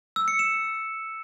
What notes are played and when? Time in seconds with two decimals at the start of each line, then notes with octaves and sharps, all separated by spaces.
0.16 E6
0.28 C#7
0.39 E7